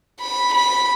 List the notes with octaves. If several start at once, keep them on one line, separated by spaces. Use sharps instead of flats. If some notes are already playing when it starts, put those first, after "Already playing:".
B5
B5